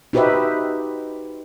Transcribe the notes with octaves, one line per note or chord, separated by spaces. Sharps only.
D#4 F#4 G4 B4 C5 E5